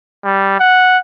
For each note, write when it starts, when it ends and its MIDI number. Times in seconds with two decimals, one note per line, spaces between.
0.24 0.56 55
0.60 0.98 78